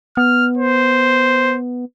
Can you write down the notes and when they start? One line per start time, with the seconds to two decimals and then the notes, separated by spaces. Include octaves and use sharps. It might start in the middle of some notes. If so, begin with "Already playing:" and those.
0.17 B3 F6
0.58 C5